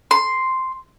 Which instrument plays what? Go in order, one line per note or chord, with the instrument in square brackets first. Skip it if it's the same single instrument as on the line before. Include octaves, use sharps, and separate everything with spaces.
[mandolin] C6